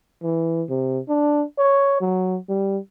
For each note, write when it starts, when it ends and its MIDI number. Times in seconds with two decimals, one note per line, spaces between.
0.22 0.64 52
0.69 0.99 48
1.09 1.44 62
1.59 1.98 73
2.01 2.38 54
2.49 2.78 55